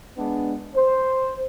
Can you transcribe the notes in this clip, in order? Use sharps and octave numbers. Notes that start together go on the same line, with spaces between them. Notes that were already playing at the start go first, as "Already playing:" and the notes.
G#3 B3 D4
C5